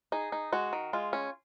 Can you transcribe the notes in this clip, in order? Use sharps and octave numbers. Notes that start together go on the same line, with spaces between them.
D#4 G#4
D#4
G#3 F#4
D#3
G#3 F4
C#4